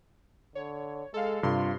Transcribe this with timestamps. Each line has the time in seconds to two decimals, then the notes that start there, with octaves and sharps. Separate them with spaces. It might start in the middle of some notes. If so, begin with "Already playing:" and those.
0.55 D3 C#5
1.14 G#3 A4 F5
1.43 G2 C3 F4 C6